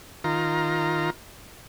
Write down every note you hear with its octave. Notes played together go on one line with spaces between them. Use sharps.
D#3 F4 A#5